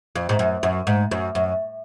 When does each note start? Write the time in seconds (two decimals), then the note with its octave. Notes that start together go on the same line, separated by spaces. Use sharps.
0.16 F2
0.29 G#2
0.39 F#2
0.63 F#2
0.87 G#2
1.11 F#2
1.35 F#2